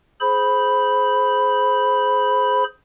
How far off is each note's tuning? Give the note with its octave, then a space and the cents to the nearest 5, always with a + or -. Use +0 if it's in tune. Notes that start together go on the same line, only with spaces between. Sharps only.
G#4 +25 C5 +0 B5 +0